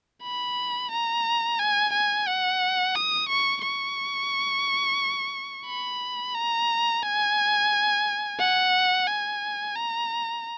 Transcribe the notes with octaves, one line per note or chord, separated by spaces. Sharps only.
B5
A#5
G#5
G#5
F#5
D#6
C#6
C#6
B5
A#5
G#5
F#5
G#5
A#5